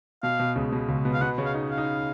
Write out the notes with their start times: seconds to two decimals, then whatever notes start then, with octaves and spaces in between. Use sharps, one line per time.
0.23 B2 F5
0.39 B2
0.56 C#2 C#3
0.72 B2
0.88 C#2 C#3
1.05 B2 B3
1.14 F5
1.21 B2 B3 F#5
1.38 C#3 C#4
1.46 F5
1.54 D#4
1.70 F5
1.78 D#4